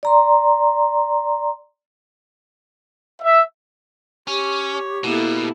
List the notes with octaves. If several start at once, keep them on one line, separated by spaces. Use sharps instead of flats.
D5 A#5 C6
E5
C#4 G4 C#5
B2 A#3 B3 E4 A4